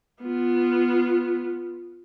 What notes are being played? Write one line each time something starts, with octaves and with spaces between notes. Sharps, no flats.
B3 F4